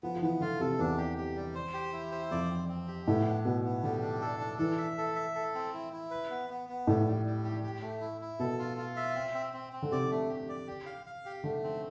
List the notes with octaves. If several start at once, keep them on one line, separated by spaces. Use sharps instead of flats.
F3 B3
F3
E3 B3
D3 F4
C3 A4
E2 D4
G4
G4
G3
C5
G4
E4
C5
F2 D5
C4
C4
G4
A2 B3
D4
B2 B3
B3
D3 G3
D4
A4
D4
E3 A4
E5
A4
E5
A4
C4
E4
E4
B4
B3
B3
B3
A2 G3
G3
G3
G4
G4
A3
E4
E4
B2 A4
F4
F4
E5
C4
C4
C4
C4
D3
C3 D5
A3
G4
D5
G4
F5
F5
G4
D3 A3
C4